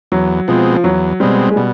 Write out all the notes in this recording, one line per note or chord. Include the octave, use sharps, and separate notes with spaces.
E2 F#3
B2 F3 G#3 C4
F3
E2 F#3
B2 G3 G#3 C4
G#3
B2 G3